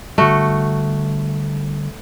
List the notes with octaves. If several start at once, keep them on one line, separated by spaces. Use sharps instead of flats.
D3 G3 A3 F#4